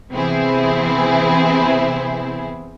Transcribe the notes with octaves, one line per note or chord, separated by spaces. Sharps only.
C3 E3 B3 C4 E4 G#4